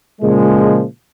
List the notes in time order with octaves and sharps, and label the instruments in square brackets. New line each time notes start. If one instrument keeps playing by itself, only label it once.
[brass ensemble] A#2 C#3 F3 G#3